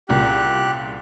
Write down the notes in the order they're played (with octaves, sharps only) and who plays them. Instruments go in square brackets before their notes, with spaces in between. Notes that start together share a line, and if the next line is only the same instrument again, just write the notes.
[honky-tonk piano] C2 A#2 C#3 [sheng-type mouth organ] G4 F#6